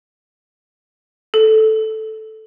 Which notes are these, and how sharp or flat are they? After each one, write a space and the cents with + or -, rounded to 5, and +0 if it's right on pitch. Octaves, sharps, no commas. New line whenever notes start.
A4 -5